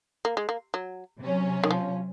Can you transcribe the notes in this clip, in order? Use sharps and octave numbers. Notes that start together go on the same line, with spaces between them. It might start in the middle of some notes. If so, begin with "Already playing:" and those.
A#3
G#3
A#3
F#3
C3 F#3 C#4
D#3
F3